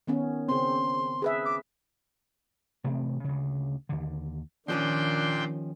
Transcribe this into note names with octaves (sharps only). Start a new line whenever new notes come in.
D#3 B3 C#4
C#3 C4 C6
G#4 B4 E5
D6
A1 C3 A3 C4
D2 C#3
D#2 D3
D#2 A#2 D#3 F3 C#4 D4 G5 C6